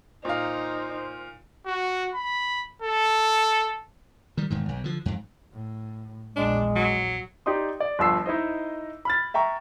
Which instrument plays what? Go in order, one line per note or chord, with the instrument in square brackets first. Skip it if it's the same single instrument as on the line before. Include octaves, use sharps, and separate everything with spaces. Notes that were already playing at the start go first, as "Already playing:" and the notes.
[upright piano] A#2 F5 [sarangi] D#4 [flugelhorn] C5
[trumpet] F#4
B5
A4
[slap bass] D#3 G3
E1 G#2 D#3
B1
D3 F3
F2 G#2
[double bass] A2
[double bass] A#1 E2 [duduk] G#3 [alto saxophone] D4
[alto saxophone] F#3
[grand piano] D#4 G4 D5 C6 D#6
D5
G1 F3 E6 C7
D#4 E4 C5 D#5
B5 F6 A6
E5 G5 A#5 C#6